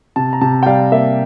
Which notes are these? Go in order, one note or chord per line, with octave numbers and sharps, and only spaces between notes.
C3 A5
A#5
C3 A5
G5
G3 F5
A#3 E5